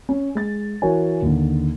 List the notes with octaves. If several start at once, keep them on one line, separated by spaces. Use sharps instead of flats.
C#4
G#3 A6
E3 F#4 A#4 C#5 G#5
D#2 D3